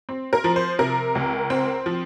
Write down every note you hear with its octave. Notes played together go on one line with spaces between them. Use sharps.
C4
A#4
F3
C5
C3 A#4
C#2
C4
F3